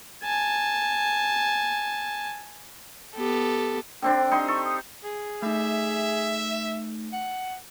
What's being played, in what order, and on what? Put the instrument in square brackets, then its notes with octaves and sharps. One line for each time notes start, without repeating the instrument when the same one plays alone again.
[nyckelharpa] G#5 A5
[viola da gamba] B3 G4 A4
[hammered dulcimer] D3 C4 D4 [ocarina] G5
[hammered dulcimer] D#4 G4 C6
[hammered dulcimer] A4 [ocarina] C#6
[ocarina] D#6
[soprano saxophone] G#4
[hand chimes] A3 D#4 [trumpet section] E5
[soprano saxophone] F#5